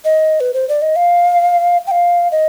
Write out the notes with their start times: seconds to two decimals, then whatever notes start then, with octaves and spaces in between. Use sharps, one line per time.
0.05 D#5
0.40 B4
0.54 C5
0.69 D5
0.82 D#5
0.96 F5
1.87 G5
1.91 F5
2.32 D#5